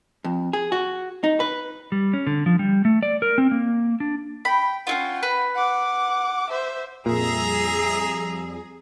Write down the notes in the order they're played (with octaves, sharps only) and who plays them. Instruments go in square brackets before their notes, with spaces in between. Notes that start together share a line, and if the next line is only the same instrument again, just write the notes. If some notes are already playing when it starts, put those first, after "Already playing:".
[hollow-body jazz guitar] F2
G#4
F#4
D#4
B4
[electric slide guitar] G3
C#4
D3
F3
G3
A3
D5
A#4
C4
A#3
D4
[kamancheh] G5 [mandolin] B5
[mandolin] C#4 E4 F4 [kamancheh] F#5 G5
[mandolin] B4
[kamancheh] F#5 D6
C5 E5
[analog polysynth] F2 G3 [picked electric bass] A#2 [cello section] G#4 [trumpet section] E5 A#5